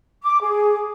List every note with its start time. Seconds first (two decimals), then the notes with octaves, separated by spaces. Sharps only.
0.23 D6
0.42 G#4